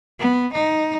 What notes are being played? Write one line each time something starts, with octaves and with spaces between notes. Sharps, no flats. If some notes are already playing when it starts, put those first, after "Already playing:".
B3
D#4